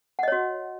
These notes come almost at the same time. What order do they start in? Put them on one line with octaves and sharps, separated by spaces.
F#5 D#5 C#5 F#4